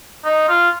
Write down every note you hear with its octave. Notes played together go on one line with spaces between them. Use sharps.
D#4
F4